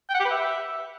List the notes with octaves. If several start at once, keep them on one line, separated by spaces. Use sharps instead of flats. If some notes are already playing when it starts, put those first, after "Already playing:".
G5
F#5
G4
B4
E5